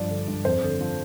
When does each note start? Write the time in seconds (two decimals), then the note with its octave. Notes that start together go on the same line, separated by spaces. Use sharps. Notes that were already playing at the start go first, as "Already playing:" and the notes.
Already playing: G2 F3 D5
0.10 D3
0.28 G2
0.45 F2 C5
0.63 D3
0.81 F3